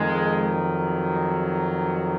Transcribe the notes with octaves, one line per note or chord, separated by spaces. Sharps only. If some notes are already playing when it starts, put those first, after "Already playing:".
Already playing: F2 D#3 G#3
F#3